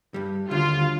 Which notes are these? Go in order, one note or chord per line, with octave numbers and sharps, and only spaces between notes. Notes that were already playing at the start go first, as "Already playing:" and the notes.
G2 G3
D#2 D3 F4